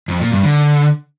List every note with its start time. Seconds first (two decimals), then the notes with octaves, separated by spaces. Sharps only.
0.08 F2
0.20 A#2
0.32 G2
0.43 D3